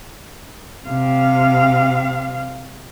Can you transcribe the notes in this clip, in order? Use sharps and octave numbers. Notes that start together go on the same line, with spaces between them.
C3 F5